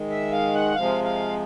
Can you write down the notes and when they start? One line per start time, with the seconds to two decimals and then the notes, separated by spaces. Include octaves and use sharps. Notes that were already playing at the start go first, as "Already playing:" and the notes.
Already playing: D#3 G#3
0.10 E5
0.32 F5
0.54 F#5
0.75 C3 F3 G#3 F5
1.04 F5